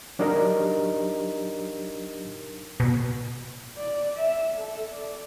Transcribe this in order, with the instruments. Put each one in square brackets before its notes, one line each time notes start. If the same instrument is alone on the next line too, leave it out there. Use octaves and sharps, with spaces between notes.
[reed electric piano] F#3 D4 D#4 G4 A#4 D#5
[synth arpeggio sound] B2
[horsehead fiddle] D5
E5
A4
D5